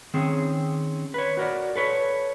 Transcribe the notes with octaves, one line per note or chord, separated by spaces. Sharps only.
D#3 C4 C#4 G#4
B4 C#5
F#4 A#4 D5
A4 B4 C#5